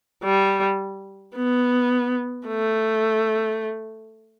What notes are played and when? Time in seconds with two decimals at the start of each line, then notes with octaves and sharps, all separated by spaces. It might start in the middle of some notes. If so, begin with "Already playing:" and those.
0.24 G3
1.36 B3
2.47 A3